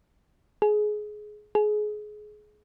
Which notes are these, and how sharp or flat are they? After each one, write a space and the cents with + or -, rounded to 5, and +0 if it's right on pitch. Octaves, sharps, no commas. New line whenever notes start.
G#4 +20
G#4 +25